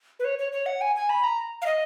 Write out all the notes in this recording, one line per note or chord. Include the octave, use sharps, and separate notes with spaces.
B4
C#5
C#5
C#5
F#5
G#5
G#5
B5
A#5
F5
D#5